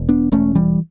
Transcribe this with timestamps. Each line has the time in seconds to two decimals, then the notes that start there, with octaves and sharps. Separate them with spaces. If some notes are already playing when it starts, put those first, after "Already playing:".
Already playing: E1
0.09 B3 D4
0.32 E1 A3 C#4
0.55 E3 G3